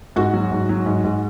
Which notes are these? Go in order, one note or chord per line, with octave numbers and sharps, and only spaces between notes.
G#2 F#4
F#3
G#2
F#3
G#2
G#2